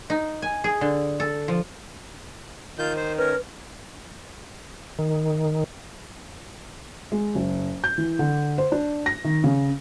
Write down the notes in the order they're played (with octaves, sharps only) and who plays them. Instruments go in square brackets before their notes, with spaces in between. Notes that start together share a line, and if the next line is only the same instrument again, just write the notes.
[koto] D#4
G#5
G#4
D3
A4
F3
[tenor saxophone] D#3 [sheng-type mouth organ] F4 G6
[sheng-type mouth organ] C5
[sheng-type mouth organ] C#4 A#4 [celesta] B4
[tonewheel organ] D#3
[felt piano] G#3
F#1
G6
E3
D3
C5
D4
A#6
D#3
C#3